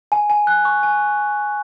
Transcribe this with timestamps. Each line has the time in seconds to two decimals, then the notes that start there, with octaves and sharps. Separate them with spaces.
0.12 G#5
0.30 G#5
0.47 F#6
0.65 C#6
0.83 G#5